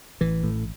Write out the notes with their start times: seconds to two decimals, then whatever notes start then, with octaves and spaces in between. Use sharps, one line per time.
0.21 A1 E3
0.44 A2